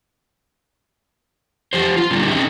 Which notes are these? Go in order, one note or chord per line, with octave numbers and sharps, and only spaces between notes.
F3 G4 C5
F4
A#2 D3 D#3 G3
C4 C#4 D#4 E4 G#4